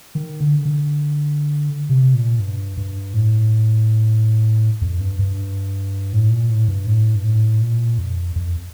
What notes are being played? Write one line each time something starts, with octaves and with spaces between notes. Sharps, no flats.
D#3
D3
D3
C3
A#2
G2
G2
A2
F2
G2
G2
A2
A#2
A2
G2
A2
G2
A2
A#2
F2
F2